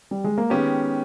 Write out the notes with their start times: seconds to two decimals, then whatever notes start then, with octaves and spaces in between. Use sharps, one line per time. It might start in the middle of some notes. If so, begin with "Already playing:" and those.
0.11 G3
0.24 G#3
0.38 A#3
0.50 D#3 G#3 B3 C#4 G4